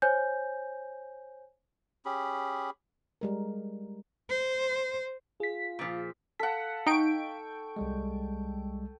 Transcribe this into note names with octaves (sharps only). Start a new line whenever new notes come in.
C5 C#5 G#5 G6
C#4 G4 G#4 B5
G3 G#3 A#4
C5
F4 G#4 B6
A#2 F3
A4 F5 F#5 B6
D#4 G5 C#6 D7
C2 G3 G#3